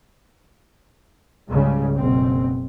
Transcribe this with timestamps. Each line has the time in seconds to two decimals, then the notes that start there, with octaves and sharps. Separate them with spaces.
1.49 C#2 G#2 C#3 G3
1.96 F#1 B2 C4